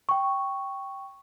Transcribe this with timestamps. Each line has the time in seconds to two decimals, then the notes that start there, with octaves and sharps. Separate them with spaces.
0.09 G5 C#6